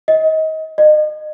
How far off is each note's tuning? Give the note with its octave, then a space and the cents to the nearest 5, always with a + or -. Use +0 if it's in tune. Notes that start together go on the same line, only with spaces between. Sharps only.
D#5 +25
D#5 -35